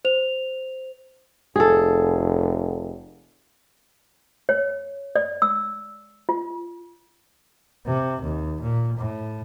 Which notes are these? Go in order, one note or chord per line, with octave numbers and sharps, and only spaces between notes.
C5 F7
F1 G#4 A4
C#5
D5
E6
F4
C3
D#2
A#2
A2